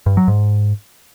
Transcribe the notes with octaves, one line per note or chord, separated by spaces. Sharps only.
G2
F#3
G#2